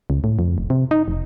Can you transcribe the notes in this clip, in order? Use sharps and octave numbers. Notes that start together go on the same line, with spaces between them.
C#2
A2
F2
F1
C3
D#4
F1